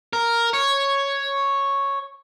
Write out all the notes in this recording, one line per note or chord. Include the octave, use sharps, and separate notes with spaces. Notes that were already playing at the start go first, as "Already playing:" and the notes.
A#4
C#5